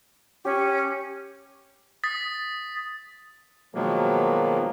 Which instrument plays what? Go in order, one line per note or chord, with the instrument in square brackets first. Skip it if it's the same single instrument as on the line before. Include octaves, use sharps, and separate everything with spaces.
[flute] C#4 [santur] G4
[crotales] D#6 A6 B6
[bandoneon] B2 D#3 F3 F#3 G#3 A#3